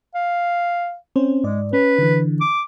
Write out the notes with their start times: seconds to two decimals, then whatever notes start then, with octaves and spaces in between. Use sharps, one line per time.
0.15 F5
1.16 C4 C#4 C5
1.44 G#2 G#3 D5
1.73 C#4 B4
1.98 D3 E3
2.41 D6